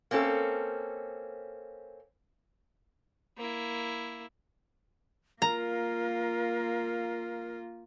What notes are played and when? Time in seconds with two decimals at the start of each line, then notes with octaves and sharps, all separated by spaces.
0.11 A#3 C4 C#4 F4 A4
3.38 A#3 E4
5.42 A#3 F4 A#4 A#5